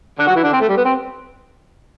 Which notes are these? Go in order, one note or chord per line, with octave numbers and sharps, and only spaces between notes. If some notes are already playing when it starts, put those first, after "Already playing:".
D3 D4
F#3 F#4
E3 E4
D3 D4
C4
A3
G3
B3
C4